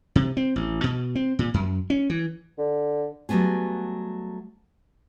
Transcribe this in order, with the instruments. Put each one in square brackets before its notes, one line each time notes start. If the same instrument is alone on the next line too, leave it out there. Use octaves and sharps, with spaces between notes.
[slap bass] C3
C4
A1
B2
C4
A#2
F#2
C#4
E3
[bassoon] D3
[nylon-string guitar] F#3 G3 A3 B3 G#4